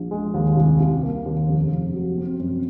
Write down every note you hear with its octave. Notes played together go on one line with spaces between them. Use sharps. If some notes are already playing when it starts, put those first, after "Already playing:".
Already playing: A#1
G#3
D#2
C2
C2
A#3
D#2
F1
F1
F#3
C4
F#2